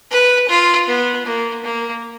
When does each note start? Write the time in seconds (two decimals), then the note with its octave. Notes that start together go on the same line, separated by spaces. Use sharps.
0.11 B4
0.48 F4
0.88 B3
1.26 A#3
1.64 A#3